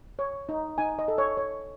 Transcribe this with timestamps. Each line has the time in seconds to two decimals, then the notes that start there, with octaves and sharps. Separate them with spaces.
0.19 C#5
0.49 D#4
0.78 D#4 G#5
0.99 D#5
1.08 A4
1.18 C#5
1.37 C#5